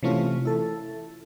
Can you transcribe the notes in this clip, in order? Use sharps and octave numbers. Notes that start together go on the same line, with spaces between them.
C3 E3 A3 C#4 F4
E4 A4